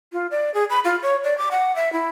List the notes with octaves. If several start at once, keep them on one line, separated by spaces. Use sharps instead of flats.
F4
D5
G#4
B5
F4
C#5
D5
D6
F#5
E5
E4